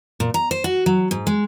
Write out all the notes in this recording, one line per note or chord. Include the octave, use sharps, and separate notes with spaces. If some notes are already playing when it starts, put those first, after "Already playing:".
A#2
A#5
C5
F#4
F#3
G#2
G#3